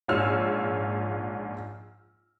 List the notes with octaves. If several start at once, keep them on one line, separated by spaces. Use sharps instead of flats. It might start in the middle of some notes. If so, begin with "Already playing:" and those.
A#1 G#2 F4 C#5 E6 F6